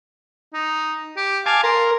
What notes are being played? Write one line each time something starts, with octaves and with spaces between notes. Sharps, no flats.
D#4
G4
F5 G#5 A5 D6
A#4 C6